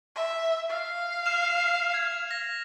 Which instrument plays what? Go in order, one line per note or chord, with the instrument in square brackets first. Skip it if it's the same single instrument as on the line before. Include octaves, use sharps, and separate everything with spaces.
[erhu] E5
F5
[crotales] F6 E7 F7
G#6
A#6